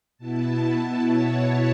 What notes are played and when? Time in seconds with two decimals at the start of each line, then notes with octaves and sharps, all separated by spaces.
0.17 B2 B3 E4 A5
1.04 C#5